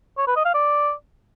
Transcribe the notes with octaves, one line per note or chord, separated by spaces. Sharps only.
C#5
B4
D#5
F5
D5